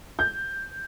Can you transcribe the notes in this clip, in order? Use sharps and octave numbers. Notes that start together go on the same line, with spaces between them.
G6